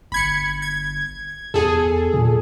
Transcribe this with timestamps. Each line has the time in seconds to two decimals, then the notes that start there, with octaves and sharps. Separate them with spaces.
0.12 G1 B5 G#6 C#7
0.62 G#6
1.54 E2 G#4 A4
2.14 A#2